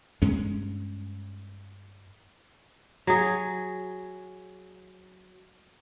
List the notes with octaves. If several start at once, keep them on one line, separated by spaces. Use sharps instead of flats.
G2 G#3 C#4
F#3 G#4